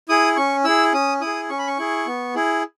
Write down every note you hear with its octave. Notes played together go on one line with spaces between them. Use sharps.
E4 G#4 D#6
C#4 C#6
E4 G#4 E6
C#4 D#6
E4 D#6
G#4
C#4 C#6
B5
C#6
E4 G#4
B3
E4 G#4